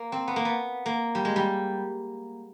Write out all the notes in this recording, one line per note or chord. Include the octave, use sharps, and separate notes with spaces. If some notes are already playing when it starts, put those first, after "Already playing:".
Already playing: A#3
C4
B3
A#3
B3
A#3
G3
G#3
G3